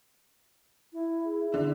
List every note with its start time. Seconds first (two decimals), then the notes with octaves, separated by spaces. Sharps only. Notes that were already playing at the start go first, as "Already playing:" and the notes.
0.93 E4
1.25 G#4
1.52 D3 E4